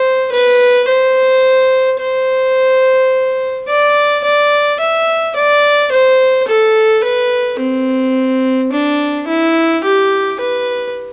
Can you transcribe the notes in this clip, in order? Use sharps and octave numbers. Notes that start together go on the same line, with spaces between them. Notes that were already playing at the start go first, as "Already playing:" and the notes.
Already playing: C5
B4
C5
C5
D5
D5
E5
D5
C5
A4
B4
C4
D4
E4
G4
B4